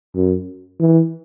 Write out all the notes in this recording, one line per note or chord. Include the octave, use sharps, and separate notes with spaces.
F#2
E3